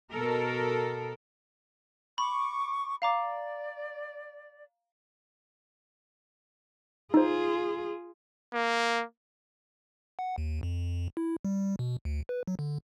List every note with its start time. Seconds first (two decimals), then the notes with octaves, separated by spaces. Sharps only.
0.13 B2 A4 A#4
2.18 B5 C#6 D6
3.02 D5 F5 A#5 D6
7.14 D#4 F4 G#4 C5
8.53 A#3
10.19 F#5
10.38 D#2
10.63 F2
11.17 E4
11.45 G3
11.79 B2
12.05 D2
12.29 B4
12.47 F#3
12.59 D3